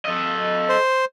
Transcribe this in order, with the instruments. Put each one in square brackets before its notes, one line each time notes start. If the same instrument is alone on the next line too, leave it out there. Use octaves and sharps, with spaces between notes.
[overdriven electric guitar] A4 D#5
[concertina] C5